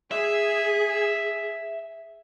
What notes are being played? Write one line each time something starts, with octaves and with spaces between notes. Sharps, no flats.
G#4 E5